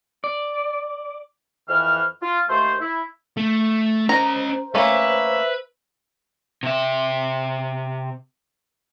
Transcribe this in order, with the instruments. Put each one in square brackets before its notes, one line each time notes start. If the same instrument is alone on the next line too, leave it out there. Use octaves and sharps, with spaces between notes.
[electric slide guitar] D5
[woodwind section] F2 E3 F6
F4
D#2 A3 C5
E4
[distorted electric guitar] A3
[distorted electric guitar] C#4 D#5 [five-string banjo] A#4 A#5 [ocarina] C5
[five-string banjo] A3 A#3 C#4 [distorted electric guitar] B4 [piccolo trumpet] E5
[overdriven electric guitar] C3 E5